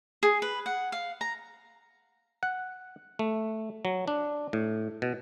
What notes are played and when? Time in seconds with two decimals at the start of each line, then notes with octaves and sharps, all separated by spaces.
0.23 G#4
0.42 B4
0.66 F#5
0.92 F5
1.21 A#5
2.43 F#5
3.19 A3
3.85 F#3
4.08 D4
4.53 A2
5.02 B2